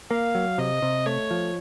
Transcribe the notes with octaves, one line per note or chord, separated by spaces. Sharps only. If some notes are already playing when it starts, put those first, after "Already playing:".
A#3 F5
F#3
C3 D#5
C3
A3 C#5
F3